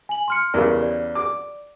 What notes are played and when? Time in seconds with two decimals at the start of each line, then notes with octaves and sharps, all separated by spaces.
0.09 G#5 F#7
0.28 C6 F6 C#7
0.54 E2 C#3 G4 A#4 D5
0.82 D5
1.15 D6